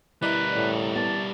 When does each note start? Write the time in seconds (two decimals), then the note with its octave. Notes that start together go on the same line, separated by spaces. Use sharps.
0.22 G3 E4 A#4 B4 D5 D#5
0.56 A2
0.95 B3 E4 A5